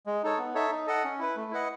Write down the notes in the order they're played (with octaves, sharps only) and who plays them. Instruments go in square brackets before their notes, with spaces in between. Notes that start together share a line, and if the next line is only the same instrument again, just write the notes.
[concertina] G#3
D#4 A4 C#5
B3
D#4 A4 C#5 E5
D#4
A4 D#5 F#5
C#4
E4 B4
A3
E4 B4 D#5 F#5